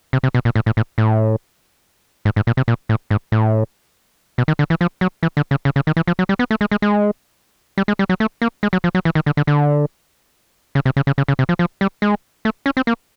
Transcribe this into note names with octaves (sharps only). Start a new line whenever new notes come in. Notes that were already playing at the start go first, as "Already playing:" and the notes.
C3
C3
B2
A#2
A2
A2
A2
A2
G#2
G#2
A#2
C3
A#2
A2
G#2
A2
B2
D#3
D3
E3
F3
F#3
E3
D3
C#3
C#3
C#3
D#3
E3
F3
F#3
G3
B3
A3
G#3
G#3
G#3
G3
G#3
G3
F#3
A3
A#3
G#3
F#3
F3
F#3
E3
D#3
D3
D3
D3
C#3
C3
C#3
C#3
C#3
C#3
C3
F3
F3
G3
G#3
A3
C#4
C4
A#3